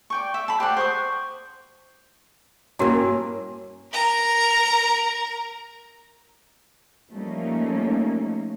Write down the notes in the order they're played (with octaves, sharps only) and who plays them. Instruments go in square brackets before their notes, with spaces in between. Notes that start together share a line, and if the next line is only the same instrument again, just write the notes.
[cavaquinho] D5 G5 C#6
E5
A5 B5
G4 C5 D5 F#5
C5 C#6 D#6
[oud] G2 A#3 [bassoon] C#4 [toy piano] E4 F#4 A#4
[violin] A#4 A#5
[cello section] F3 G3 A3 A#3 C#4 D#4